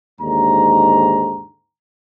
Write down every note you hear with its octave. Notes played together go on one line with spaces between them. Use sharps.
D#2 G#2 D3 A#5